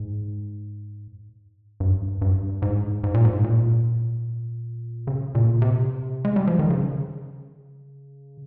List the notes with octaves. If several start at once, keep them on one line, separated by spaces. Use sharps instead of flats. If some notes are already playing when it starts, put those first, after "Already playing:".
Already playing: G#2
G2
G2
G#2
G#2
A#2
G#2
A#2
C#3
A#2
C3
G#3
G3
F3
D#3
C#3